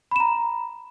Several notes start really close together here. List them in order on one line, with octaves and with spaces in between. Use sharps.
B5 E7 A#5